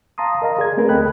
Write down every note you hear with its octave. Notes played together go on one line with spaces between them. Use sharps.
F5 A5 A#5 C6 D#6
A#4 D#5 F5 A#5
G#4 D5 G#6
A3 C4 G#4 A#4 B4
D2 A4 D#5 G5 B5 F#6